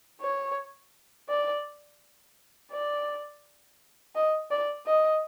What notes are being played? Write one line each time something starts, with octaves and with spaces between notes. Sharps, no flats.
C#5
D5
D5
D#5
D5
D#5